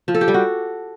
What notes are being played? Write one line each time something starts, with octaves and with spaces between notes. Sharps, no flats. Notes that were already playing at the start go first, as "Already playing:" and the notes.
F3
A4
G4
G3
F#4